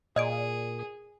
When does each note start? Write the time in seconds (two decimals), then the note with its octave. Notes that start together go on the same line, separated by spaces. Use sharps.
0.16 A#2 G#4 D5 D#5 F6 G#6 D7